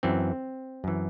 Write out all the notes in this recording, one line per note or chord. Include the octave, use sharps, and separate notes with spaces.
F#2 E3 C4
F#2 E3